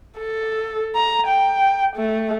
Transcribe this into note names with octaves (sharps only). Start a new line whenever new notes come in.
A4
A#5
G5
A3